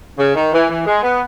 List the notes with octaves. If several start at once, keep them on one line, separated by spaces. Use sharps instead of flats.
C#3
D#3
E3
E3
G#3
B3